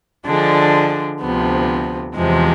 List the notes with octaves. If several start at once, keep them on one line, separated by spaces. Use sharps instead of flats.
D3 F3 G#3 D4
D2 C3 F3 B3
E2 C3 F3 G#3